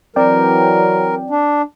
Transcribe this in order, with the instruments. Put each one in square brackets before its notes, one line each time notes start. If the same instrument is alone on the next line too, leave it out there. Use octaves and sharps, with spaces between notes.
[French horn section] E3 F#3 [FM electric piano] C4 D5 G5 [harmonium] A#4
[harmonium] D4